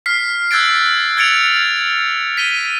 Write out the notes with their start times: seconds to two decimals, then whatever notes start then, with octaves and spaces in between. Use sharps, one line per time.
0.06 F6 B6 C7
0.51 E6 F#6 G#6 A6 D7
1.17 F6 G#6 A6 C#7 D7 F7
2.37 B6 D#7 G7